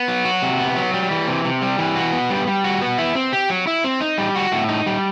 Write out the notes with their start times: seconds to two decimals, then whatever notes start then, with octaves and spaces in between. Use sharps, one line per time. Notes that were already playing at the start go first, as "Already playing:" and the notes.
Already playing: B3
0.08 F#3
0.25 F#4
0.42 C3
0.60 B3
0.76 F#3
0.93 G3
1.11 E3
1.27 C3
1.45 C3
1.62 G3
1.79 E3
1.96 F#4
2.13 B3
2.30 G3
2.47 G3
2.64 F#4
2.81 B3
2.98 E4
3.15 C4
3.33 G4
3.50 F#3
3.67 E4
3.84 C4
4.01 D#4
4.18 G3
4.36 F#4
4.52 A2
4.69 D#4
4.86 G3